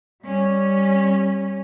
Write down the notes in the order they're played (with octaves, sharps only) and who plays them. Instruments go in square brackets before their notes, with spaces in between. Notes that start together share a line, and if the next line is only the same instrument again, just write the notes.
[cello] G3 C#4